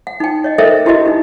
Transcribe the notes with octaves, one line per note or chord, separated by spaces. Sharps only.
F#5
D#4 G5
C#5 D#5
A4 A#4 C5 D#5 E5 G5
D4 E4 F#4 G4 B4 D#5
D#4 B4